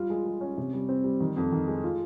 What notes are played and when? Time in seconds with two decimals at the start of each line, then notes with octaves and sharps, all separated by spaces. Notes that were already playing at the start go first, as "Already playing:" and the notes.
Already playing: G3 F4
0.10 G#3
0.25 G#3
0.41 C#4
0.57 C3
0.73 G3
0.89 C4
1.04 G3
1.20 D#3
1.37 F2
1.52 D#3
1.68 G#3
1.83 F4